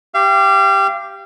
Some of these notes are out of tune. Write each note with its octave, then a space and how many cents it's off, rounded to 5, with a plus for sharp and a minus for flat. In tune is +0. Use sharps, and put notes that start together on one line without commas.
G4 +0 F5 -35